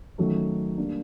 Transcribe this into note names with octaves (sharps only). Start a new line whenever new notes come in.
D#3 F#3 A3 C#4
G3 A#3 D4